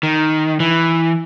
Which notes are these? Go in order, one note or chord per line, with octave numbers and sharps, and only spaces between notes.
D#3
E3